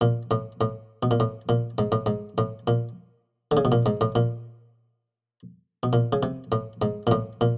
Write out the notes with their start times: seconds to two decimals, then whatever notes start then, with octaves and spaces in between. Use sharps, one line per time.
0.01 A#2
0.31 A2
0.61 A2
1.03 B2
1.11 A#2
1.20 A2
1.49 A#2
1.78 G#2
1.92 A2
2.06 G#2
2.38 A2
2.67 A#2
3.51 D3
3.57 C#3
3.65 B2
3.72 A#2
3.86 G#2
4.01 A2
4.15 A#2
5.83 B2
5.93 A#2
6.12 C#3
6.23 C3
6.52 A2
6.82 G#2
7.07 A#2
7.11 A2
7.41 A#2